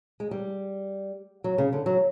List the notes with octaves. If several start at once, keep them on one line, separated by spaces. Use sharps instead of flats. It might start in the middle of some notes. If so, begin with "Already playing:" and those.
G#3
G3
F#3
C#3
D3
F#3